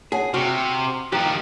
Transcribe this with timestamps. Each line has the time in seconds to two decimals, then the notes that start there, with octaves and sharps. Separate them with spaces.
0.12 G#4 C#5 F#5 A5
0.34 C3 F#4 F6
1.12 D#3 F3 G4 A#5 F#6